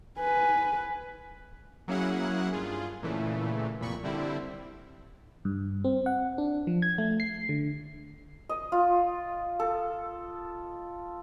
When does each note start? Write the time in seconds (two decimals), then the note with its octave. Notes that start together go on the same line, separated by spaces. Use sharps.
0.20 B4 G#5
1.88 F#3 A#3 C#4 E4 G#4 F#5
2.53 G2 F4 G#4
3.02 A#2 C#3 E3 A3
3.80 C2 F2 A#2 B5 C#6
4.03 D3 G3 C4 E4
5.45 G2
5.84 C4
6.06 F#5
6.38 D4
6.67 F3
6.82 G#6
6.98 A3
7.20 C7
7.49 D3
8.49 D#5
8.72 F4
9.60 A4